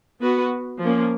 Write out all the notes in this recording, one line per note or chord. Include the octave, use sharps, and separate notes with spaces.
B3 F#4 B4
F3 A#3 C#4